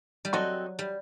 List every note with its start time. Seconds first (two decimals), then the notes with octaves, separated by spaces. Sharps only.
0.25 G3
0.33 F#3 C4 F#4 A4 D#5
0.79 G3